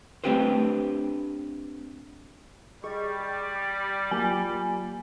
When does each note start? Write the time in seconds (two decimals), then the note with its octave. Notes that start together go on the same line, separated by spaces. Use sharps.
0.24 A3 C4 D4 G4 B4 C5
2.84 G3 G#4 D5 D#5 C#6
3.20 G5 A6
3.56 D6
4.11 F#3 A#3 F4 G4 G#5